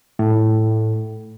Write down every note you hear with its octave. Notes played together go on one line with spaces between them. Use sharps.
A2